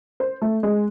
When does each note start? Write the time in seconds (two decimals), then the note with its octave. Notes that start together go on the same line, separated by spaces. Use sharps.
0.20 C5
0.42 A3
0.63 G#3